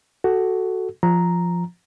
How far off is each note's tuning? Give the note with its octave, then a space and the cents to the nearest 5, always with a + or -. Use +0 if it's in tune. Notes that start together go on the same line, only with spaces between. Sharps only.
F#4 +10 A4 +0
F3 +0 A#5 +0